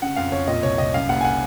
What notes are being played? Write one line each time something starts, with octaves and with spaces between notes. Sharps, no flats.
C#3 F#5
F2 F5
F2 C#5
A#2 D#5
C2 C#5
C2 D#5
F#2 F5
F#1 F#5
G#5
F#5